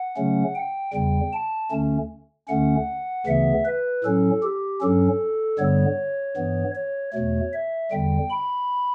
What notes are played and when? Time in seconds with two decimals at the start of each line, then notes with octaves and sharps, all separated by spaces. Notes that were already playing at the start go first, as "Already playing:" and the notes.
Already playing: F#5
0.17 C#3 F#3 A3 C#4
0.55 G5
0.93 E2 C#3 G3 G5
1.33 A5
1.71 D2 D3 A3 C#4
2.48 D2 D3 A3 C#4 F#5
3.26 D2 C#3 E3 B3 E5
3.65 B4
4.04 A2 F#3 C#4 A4
4.43 G4
4.81 G2 F#3 C#4 A4
5.59 G2 D3 G3 B3 C#5
6.37 G2 E3 B3
6.75 C#5
7.13 E2 B2 A3 C#5
7.53 E5
7.91 E2 D3 G3 G5
8.30 B5